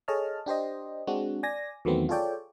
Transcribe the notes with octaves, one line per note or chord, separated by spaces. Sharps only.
G#4 A4 C#5 D#5 A5 F6
D4 G4 C5 D#5
G#3 C4 D4 F#4
D5 G#5 A#6
E2 D#3 F#3 A3 B3 C4
F4 G#4 A4 C#5 D5 G5